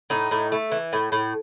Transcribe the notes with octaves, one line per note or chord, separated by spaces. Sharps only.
A2 D#4
A2
A3
E3
A2
A2